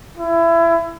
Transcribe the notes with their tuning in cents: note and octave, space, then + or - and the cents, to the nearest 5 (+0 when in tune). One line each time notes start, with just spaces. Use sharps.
E4 +25